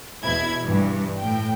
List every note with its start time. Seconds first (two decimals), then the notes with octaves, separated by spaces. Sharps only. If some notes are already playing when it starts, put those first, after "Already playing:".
0.25 E2 B2 E4 G#6
0.66 G2 E3
1.19 A2 G5